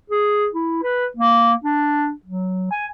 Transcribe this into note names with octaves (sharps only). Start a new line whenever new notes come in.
G#4
E4
B4
A#3
D4
F#3
G#5